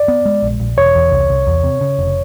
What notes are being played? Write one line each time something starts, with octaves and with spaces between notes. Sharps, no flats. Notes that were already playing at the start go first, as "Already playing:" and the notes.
Already playing: D5
B3
G#3
A#1
A#1
E1 C#5
E2
C2
C2
E2
C3
C#3
F1